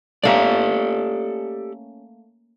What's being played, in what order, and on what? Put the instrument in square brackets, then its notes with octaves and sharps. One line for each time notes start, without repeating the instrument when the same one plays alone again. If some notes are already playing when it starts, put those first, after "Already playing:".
[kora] A3 A#3 C#4 [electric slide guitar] G4 A4 D5